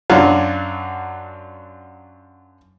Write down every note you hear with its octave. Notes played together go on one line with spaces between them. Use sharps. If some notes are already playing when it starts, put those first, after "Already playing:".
F#2 F#3 D4 F4